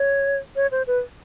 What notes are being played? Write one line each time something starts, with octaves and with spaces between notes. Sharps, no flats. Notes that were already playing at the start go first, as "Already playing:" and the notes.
Already playing: C#5
C#5
C5
B4